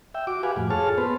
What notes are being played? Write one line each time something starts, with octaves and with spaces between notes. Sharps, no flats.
E5 G5
F#4 D6
G4 B4 F5 F#5 G#5
F2 A2
F4 G#4 A4 C#5 A5 F6
B3 B4 C5